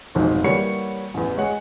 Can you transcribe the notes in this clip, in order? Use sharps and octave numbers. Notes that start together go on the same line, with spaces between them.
F1 B1 G#2
E3 G3 A#3 C#5 F#5 C#7
A1 E2
G#3 C#5 F#5